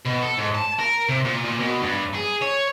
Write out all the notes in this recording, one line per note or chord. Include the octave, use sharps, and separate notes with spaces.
B2
A4
G#2
A5
A#4
C3
A#2
A#2
B2
G2
G#4
C#5